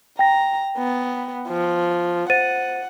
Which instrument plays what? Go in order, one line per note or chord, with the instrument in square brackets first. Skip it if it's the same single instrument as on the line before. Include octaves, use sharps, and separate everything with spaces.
[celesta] G5 A#6 [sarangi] A#5
[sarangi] B3
F3
[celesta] C5 A6 D#7 [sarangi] F#5